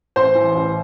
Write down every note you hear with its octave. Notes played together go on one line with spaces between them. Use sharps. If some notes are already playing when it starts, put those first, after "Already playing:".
A1 C5 C6
E3
A1